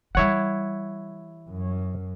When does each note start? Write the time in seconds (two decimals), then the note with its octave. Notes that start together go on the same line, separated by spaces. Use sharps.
0.15 E3 G3 E4 C#5 F#5
1.49 F#2